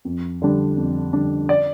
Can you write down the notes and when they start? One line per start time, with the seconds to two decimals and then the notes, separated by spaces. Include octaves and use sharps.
0.05 F2
0.42 D3 G3 D4
0.77 F2
1.13 D3 G3 D4
1.49 D5